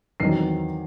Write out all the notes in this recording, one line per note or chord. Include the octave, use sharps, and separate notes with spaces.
E2 D#3 F#3 C4 D#4 C7